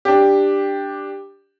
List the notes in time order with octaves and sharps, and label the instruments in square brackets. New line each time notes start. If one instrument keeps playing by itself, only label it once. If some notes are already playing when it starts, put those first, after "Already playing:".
[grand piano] D4 G4